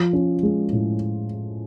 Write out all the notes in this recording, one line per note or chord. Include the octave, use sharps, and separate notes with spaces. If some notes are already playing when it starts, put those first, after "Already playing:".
Already playing: F3
C#4
G#3
A2